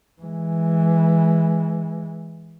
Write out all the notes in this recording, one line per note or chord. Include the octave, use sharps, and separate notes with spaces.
E3 G#3